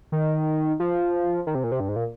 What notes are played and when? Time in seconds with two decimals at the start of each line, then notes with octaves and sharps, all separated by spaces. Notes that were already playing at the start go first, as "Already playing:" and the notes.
0.12 D#3
0.80 F3
1.47 D#3
1.55 C3
1.64 A#2
1.72 C3
1.80 G2
1.89 G#2
1.96 A#2